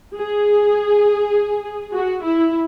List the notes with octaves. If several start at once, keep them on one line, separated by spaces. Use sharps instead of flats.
G#4
F#4
E4